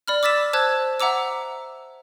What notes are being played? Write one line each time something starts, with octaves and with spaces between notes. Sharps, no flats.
D5 B5 F6
D6 E6 A6 B6 E7
C5 A5 E6 F#6 G#6
E5 F#5 A#5 D6 E6